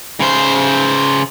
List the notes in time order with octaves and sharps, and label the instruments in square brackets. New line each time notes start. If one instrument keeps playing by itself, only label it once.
[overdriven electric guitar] C#3 C5